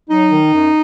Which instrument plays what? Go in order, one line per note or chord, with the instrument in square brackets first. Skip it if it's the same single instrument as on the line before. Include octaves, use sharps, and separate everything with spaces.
[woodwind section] F#3 D#4
D#3
F#2